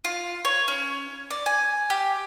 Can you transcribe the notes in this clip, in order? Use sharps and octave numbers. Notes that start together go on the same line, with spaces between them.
F4
C#5
C#4
D5
G#5
G4